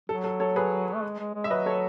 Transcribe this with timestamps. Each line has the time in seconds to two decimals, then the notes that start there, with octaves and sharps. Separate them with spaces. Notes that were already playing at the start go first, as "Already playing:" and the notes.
0.09 F#3 A4
0.24 A4
0.40 A4 C#5
0.56 G#4 B4
0.95 A3
1.03 G#3
1.19 G#3
1.35 G#3
1.44 E5
1.50 F#3 B4 D#5
1.66 A4 C#5